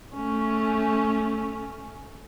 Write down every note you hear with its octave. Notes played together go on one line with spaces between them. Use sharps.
A3 C#4